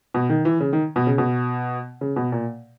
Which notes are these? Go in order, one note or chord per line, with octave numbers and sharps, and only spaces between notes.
B2
D#3
E3
C#3
D#3
B2
C#3
B2
C#3
B2
A#2